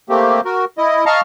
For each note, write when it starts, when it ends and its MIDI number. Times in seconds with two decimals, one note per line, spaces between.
0.09 0.41 57
0.09 0.41 58
0.09 0.41 60
0.09 0.41 67
0.45 0.65 66
0.45 0.65 70
0.78 1.05 64
0.78 1.05 75
1.06 1.21 75
1.06 1.21 77
1.06 1.21 81
1.06 1.21 82
1.06 1.21 85
1.06 1.21 89